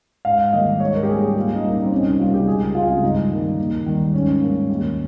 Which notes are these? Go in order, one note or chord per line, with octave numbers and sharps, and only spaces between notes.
G#2 F5
D#3 G3 A#3 D#5
G#2 C#5
A#4
G4
G3 A#3 G#4
G#4
A#2 F4
D#4
G3 A#3
D#4
C4
C2 C#4
D#4
C3 G3 A#3 F4
G4
C#2 G#4
C#3 G#3 C4 F4
G2 D#4
D#3 G3 A#3
D#2
D#3 G3
G#2 C#4
G3 A#3
D#2